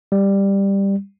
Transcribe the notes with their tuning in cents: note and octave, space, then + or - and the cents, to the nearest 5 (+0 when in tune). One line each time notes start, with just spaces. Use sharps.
G3 +10